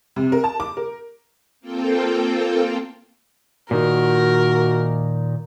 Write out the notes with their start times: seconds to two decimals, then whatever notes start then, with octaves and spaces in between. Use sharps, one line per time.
0.16 C3
0.32 A#4
0.44 A5
0.60 D6
0.77 A#4
1.61 A#3 C4 F4 A4 G5
3.71 A#2 D#3 F#4 A#4